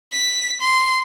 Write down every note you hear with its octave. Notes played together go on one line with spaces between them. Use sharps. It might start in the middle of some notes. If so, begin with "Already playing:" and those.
B6
C6